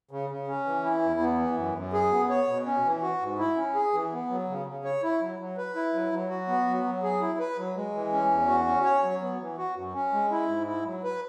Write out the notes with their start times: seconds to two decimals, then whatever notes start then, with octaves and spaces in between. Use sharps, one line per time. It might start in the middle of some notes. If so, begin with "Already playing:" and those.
0.11 C#3
0.30 C#3
0.48 C#4
0.66 E3
0.84 E4
1.02 E2
1.20 B3
1.38 E3
1.57 F#2
1.75 F#2
1.93 G#4
2.11 B3
2.29 C#5
2.48 B2
2.66 C#4
2.85 E3
3.02 F#4
3.21 G#2
3.38 E4
3.56 C#4
3.74 G#4
3.93 E3
4.12 B3
4.30 F#3
4.48 C#3
4.66 C#3
4.84 C#5
5.03 E4
5.21 F#3
5.39 F#3
5.57 B4
5.75 E4
5.94 F#3
6.12 F#3
6.29 F#4
6.48 B3
6.66 F#3
6.84 F#3
7.03 G#4
7.21 E4
7.39 B4
7.57 F#3
7.76 G#3
7.94 E3
8.12 C#4
8.31 E2
8.48 F#4
8.66 C#4
8.84 C#5
9.03 F#3
9.21 B3
9.39 E3
9.58 F#4
9.76 F#2
9.94 C#4
10.13 G#3
10.31 E4
10.48 G#2
10.67 E4
10.85 F#3
11.04 B4